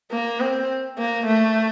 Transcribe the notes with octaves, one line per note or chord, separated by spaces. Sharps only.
A#3
C4
A#3
A3